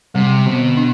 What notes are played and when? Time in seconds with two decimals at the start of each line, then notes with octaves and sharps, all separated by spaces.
0.15 C3 G3
0.46 B2 D3
0.77 D4